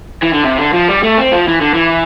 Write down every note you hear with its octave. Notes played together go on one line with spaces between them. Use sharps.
E3
D3
C3
D3
F3
G3
A3
C4
F3
E3
D3
E3